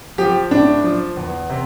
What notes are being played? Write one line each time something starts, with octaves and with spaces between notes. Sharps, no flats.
F3 G4
A2 D4
F3
E2
C3